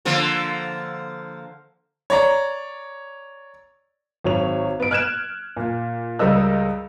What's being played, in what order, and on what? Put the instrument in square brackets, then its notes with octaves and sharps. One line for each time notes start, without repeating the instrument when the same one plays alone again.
[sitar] D3 F3 A#3
[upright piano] C#5 D5 A#5
[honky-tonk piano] G#1 F#3 C#5 F7
B3 D7
F6 F#6 G#6 D7 E7
A#2
C#2 G3 A#4 D#5 E6